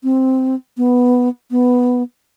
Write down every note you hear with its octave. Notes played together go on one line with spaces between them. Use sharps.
C4
B3
B3